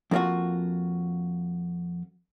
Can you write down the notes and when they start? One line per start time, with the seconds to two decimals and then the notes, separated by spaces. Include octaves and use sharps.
0.11 F2 A#3 D4 F4 F#4